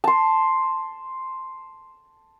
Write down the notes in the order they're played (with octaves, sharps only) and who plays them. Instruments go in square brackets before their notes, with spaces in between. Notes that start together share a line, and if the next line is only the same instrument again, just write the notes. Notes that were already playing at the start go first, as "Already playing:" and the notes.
[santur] A5 C6